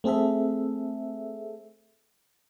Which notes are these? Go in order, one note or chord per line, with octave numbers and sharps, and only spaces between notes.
A3 C4 G#4 A4 E5